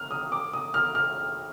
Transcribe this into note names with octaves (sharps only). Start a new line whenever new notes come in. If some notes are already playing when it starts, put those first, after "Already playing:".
Already playing: F6
D#6
D6
D#6
F6
F6